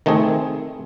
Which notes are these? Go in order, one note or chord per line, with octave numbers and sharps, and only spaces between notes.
D#3 A3 C4 G#4